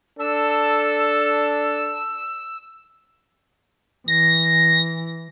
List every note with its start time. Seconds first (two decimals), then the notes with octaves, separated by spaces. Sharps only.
0.19 D4 A4 E6
4.08 E3 A#6